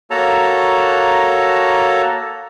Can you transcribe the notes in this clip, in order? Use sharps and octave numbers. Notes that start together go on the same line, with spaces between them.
A#3 F#4 A4 C#5 A5 A#5